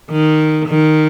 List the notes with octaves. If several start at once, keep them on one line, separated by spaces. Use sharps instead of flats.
D#3
D#3